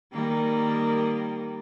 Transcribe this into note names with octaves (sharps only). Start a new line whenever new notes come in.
D#3 G3 A#3